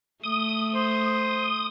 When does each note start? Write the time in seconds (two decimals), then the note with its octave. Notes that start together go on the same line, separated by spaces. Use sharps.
0.24 A3 D#6
0.75 C5